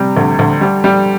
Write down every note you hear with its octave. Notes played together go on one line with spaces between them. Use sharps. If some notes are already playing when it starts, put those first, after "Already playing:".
Already playing: C3 G3
D2
D2
G3
G3